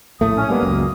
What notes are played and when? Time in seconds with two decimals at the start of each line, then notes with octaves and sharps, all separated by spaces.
0.21 A#1 A2 A3 D#6
0.36 C#4
0.50 D#3 G3 G#3 A#3 B3
0.63 C#2 F#2